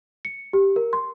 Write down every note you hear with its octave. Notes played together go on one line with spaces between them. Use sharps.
C#7
G4
A#4
C6